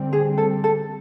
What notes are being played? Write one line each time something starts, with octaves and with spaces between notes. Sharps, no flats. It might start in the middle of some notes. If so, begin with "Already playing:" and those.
Already playing: D3 G3 C4
G#4
A4
A4